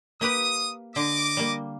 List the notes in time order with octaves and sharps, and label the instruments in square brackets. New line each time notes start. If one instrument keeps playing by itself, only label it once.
[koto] A#3 G4 B4 [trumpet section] D#6
[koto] D3 [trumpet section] D#5 D6
[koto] G3 A#3